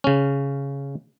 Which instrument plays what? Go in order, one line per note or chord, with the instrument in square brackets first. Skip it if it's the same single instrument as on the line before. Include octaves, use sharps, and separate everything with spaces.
[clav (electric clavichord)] C#3 C#4